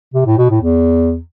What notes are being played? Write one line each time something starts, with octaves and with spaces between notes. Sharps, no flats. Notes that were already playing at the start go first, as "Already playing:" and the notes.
C3
A2
B2
A2
E2